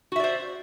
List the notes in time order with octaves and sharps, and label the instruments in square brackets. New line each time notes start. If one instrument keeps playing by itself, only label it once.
[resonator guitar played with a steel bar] F#4
E5
D5
C5